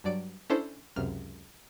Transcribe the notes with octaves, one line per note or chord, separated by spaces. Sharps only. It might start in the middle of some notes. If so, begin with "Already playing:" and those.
G2 F#3 D5 D7
C#4 D4 E4 A4 C5
C#2 F#2 C3 F6